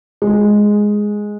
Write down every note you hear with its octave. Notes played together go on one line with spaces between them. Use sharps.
G#3